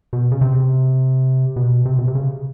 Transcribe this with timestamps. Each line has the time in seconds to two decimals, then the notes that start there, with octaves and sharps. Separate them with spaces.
0.13 B2
0.32 C#3
0.41 C3
1.56 B2
1.85 C3
1.99 B2
2.08 C3
2.15 C#3